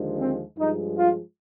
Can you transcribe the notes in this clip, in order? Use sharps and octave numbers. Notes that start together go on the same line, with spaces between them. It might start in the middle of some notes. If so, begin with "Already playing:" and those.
Already playing: D#2 D3 F3 G#3
C4
G2 F3 G#3 D#4
F4